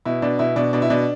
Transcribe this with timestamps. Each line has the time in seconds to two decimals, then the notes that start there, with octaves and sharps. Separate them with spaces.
0.05 B2 E4
0.22 B2 D4
0.39 B2 E4
0.56 B2 D4
0.73 B2 D4
0.82 E4
0.90 B2 D4